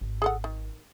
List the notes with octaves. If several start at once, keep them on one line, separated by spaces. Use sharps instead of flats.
G#1
G#4 A4 F#5
D#3